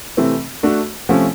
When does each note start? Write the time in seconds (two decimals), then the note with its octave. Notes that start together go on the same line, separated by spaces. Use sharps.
0.17 C3 E3 A3 C4
0.63 A3 D4 F#4
1.09 C3 F3 A3 C#4